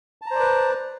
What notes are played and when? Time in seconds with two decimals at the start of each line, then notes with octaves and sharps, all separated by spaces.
0.22 A5
0.26 A#5
0.31 C5
0.35 D5
0.40 B4